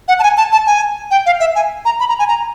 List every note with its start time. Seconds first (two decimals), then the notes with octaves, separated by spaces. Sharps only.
0.08 F#5
0.19 A5
0.23 G#5
0.37 A5
0.52 A5
0.67 G#5
1.11 G5
1.26 F5
1.40 E5
1.55 G#5
1.85 A#5
2.00 B5
2.09 A#5
2.19 G#5
2.28 A#5